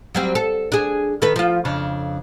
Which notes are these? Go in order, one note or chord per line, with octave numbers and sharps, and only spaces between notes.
F#3 G3 C4
A4
D4 G#4
D#3 A4 B4
F3 F4
F2 C#3 D4